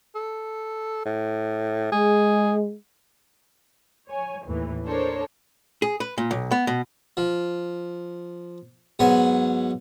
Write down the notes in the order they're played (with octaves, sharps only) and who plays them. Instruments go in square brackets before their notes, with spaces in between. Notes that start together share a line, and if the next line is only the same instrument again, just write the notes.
[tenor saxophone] A4
A2
[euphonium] G#3 [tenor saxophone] G#4
[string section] C#5 G#5
D#2 A2 E3
D4 A4 A#4 C5 C#5
[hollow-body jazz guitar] G#4
B4
A#2
B1
B3
B2
[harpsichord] F3
G#2 F#3 B3 G#5